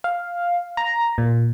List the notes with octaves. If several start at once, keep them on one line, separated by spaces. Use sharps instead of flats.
F5
A#5
A#2